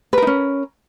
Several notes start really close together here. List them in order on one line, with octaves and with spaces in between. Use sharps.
B4 A#4 D#4 C#4